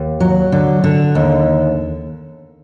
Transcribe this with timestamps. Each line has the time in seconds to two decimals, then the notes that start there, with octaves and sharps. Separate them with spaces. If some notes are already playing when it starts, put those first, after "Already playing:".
Already playing: D#2
0.20 F#3
0.52 D3
0.84 D3
1.15 D#2